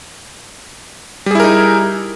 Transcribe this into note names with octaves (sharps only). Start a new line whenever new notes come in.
G3 D#4 E4 G#4 A#4